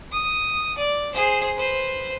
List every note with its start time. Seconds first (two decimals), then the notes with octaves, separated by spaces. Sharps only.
0.12 D#6
0.78 D5
1.14 G#4 C5
1.56 B4 C5